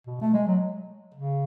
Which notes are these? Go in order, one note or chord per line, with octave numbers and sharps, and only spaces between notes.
B2
A3
G#3
F#3
C#3